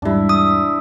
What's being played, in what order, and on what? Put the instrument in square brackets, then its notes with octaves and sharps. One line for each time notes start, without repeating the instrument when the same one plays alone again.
[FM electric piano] E2 G#2 G3 [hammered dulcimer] D4 E4
[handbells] D#6